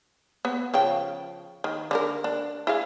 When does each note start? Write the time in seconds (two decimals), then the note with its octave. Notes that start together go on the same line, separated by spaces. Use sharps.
0.45 B3
0.74 C#3 F3 G5
1.64 D#3
1.91 D3 D4 A#4
2.24 D4
2.67 E4 G#4 F5